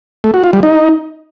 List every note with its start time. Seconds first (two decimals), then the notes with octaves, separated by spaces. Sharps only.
0.24 A3
0.34 F#4
0.44 F4
0.53 G3
0.63 D#4